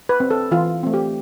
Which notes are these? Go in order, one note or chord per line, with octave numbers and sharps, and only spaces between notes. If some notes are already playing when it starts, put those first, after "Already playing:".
B4
C4
A4
E3 F4
A3 C4
G4